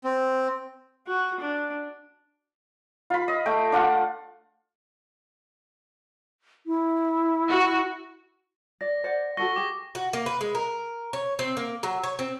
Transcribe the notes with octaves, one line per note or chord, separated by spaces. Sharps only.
C4
F#4
D4
F4 B5
D#5
A3 G5
D4 F4 F#5
E4
F#4
D5 A#6
C5 D5 F#5
F#4 A4 F#5 C#6 A#6 G7
G4 G#4 D6
F#4
A#3
B4
G#3
A#4
C#5
C4
A#3
F#3
C#5
C4